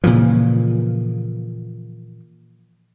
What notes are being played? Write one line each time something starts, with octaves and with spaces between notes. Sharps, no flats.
A#2 C#3 E3 F3